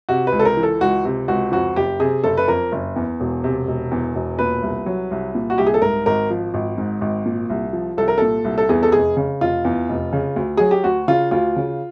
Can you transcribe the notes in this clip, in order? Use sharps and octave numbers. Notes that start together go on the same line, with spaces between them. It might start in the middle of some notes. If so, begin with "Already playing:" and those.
C3 F#4
B4
C#2
A4
A#4
E3
A4
C#2 F#4
C3
C#2 F#4
F2 F#4
F#1 G4
C3 G#4
F#1 A4
B4
F2 A#4
F#1
E2
E1
C3
E1
E2
E1
A#2 B4
C2
F#3
C2
A#2
F#4
C2 G4
G#4
A4
G#2 A#4
G#1 A#4
F3
G#1
G#2
G#1
A#2
C2
F3
C2 A4
A#4
A#2 A4
C2
A4
E2 G#4
A4
F1 G#4
C#3
F1 F4
E2
F1
C#3
D2
F#3 G#4
G4
D2 F#4
C#3 F4
D2 F4
C#3